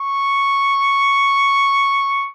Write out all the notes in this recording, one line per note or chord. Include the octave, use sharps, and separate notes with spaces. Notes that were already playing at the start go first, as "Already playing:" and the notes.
Already playing: C#6